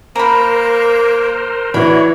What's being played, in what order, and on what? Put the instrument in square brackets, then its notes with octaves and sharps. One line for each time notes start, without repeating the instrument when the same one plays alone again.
[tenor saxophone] A#3 [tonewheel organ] A#4 C5 [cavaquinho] A#5 B5
[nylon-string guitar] E3 B4 [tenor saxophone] D4 [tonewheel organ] E4 F#4 C#5 [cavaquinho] B5